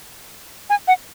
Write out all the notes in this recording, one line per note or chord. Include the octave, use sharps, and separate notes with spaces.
G#5
F#5